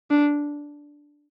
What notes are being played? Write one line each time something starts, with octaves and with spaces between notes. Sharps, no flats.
D4